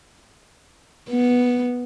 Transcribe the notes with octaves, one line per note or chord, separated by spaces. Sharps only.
B3